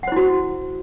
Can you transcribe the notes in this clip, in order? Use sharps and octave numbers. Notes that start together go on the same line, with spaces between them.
E4 F#4 C5 F#5